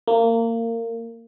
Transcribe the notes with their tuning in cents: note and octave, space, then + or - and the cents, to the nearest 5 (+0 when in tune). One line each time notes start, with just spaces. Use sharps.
A#3 -25